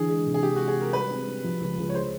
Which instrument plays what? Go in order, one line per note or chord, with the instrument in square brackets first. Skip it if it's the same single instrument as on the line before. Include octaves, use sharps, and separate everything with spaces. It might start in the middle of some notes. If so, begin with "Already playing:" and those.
Already playing: [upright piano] D3 E3 [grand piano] G#4
[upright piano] G#3
C3
[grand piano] G#4
[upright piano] G#3 [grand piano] G4
[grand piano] F#4
[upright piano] G#3
[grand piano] G#4
[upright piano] G#3 [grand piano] A#4
[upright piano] G3 [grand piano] B4
[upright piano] C4
G3
F3
C#2
C#2
[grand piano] C#5
[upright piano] G#3 [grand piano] C5